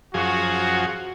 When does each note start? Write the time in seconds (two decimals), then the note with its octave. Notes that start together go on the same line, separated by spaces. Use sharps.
0.14 F#2 F3 F#4 G#4